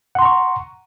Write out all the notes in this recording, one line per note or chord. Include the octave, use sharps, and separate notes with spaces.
F#5 A#5 C6 C#6